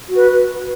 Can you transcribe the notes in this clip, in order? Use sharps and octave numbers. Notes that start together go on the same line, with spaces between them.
F#4 B4